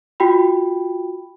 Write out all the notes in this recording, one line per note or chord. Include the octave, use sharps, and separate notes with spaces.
F4 F#4 G5 B5